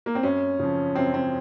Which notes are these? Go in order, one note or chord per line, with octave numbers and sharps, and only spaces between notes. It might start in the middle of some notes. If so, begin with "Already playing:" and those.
A#3
C4
F#2 C#4
C#3 F3
F#2 C4
C4